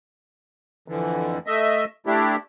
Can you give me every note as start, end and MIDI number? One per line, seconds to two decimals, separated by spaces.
0.88 1.38 41
0.88 1.38 50
0.88 1.38 52
1.47 1.85 57
1.47 1.85 75
1.47 1.85 76
2.07 2.36 57
2.07 2.36 62
2.07 2.36 64
2.07 2.36 67